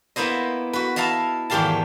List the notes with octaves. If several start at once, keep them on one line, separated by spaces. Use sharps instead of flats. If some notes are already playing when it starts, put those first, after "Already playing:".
A#3 B3 E4 C5 D#5
F#4 B4
E4 D#5 F5 A5 A#5
E2 G#2 D#3 G4 F5 A5